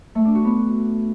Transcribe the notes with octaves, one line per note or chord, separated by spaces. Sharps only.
A3
D4
F#4
B3